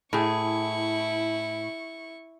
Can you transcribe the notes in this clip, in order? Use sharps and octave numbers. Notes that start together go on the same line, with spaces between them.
A2 E4 G#4 C#6